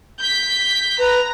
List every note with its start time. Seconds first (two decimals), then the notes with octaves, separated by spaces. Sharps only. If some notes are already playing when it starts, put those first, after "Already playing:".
0.19 G6 B6
0.99 B4 A#5